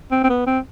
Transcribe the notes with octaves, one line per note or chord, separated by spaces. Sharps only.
C4
C4
B3
C4